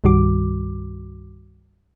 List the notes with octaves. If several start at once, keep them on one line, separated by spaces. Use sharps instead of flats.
C2 G2 D#3 G3 F#4 D6